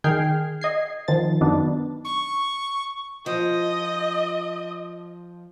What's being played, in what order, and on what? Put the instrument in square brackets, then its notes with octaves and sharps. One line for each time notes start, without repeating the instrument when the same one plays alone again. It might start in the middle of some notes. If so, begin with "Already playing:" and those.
[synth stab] D#3 G#4 G5 F6 G#6 C7
D#5 G#6 C7
D#3 F3 A6
F#2 D#3 B3 D4
[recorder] C#6
[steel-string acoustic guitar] F3 [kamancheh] D#5